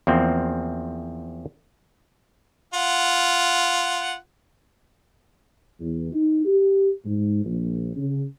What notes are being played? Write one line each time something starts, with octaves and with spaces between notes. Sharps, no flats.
E2 F3 A#3 C4
F4 F#5
E2
D#4
G4
G#2
A#1
C#3